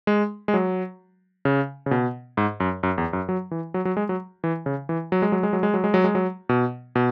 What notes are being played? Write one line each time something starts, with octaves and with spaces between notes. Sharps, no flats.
G#3
G#3
F#3
C#3
C#3
B2
G#2
F#2
F#2
E2
F#2
F#3
E3
F#3
F#3
G#3
F#3
E3
C#3
E3
F#3
G#3
F#3
G#3
F#3
G#3
F#3
G#3
F#3
G#3
F#3
B2
B2